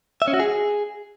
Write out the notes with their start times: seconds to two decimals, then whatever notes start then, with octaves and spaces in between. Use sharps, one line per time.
0.22 E5
0.28 C#4
0.34 F#4
0.40 G#4